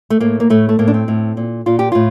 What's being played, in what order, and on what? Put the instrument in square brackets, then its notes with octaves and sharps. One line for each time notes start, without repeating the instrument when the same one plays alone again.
[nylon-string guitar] A3
A2 A#3
A#3
A2 A3
A3
A2 A#3
D4
C4
A2
A#2
A#2 F4
G4
A2 F4